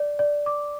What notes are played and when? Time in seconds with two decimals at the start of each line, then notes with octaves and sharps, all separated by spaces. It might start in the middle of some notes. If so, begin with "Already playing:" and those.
Already playing: D5
0.19 D5
0.46 D6